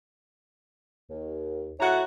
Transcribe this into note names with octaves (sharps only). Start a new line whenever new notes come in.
D#2
A2 E4 F#4 C#5 F#5 A#5